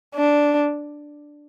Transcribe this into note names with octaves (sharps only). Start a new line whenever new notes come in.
D4